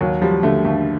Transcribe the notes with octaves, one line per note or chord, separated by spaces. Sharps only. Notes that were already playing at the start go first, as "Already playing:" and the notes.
D#2 F#3
F3 G3
D3 A3
D#2 A3